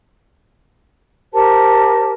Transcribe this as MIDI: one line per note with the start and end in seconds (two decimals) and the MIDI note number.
1.33 2.11 67
1.33 2.11 70
1.33 2.11 72
1.33 2.11 81